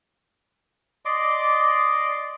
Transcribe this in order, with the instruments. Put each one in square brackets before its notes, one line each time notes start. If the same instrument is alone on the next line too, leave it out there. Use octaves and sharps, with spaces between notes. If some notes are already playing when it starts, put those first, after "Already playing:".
[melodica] D5 D#5 C6 D6